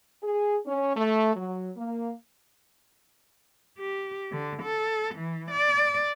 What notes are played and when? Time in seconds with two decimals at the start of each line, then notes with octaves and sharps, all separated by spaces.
0.23 G#4
0.66 C#4
0.96 A3
1.35 F#3
1.76 A#3
3.78 G4
4.32 D3
4.63 A4
5.15 E3
5.51 D5